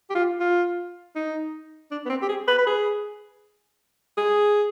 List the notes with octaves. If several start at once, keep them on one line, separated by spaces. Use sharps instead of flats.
G4
F4
F4
D#4
D4
B3
C4
G4
G#4
B4
B4
G#4
G#4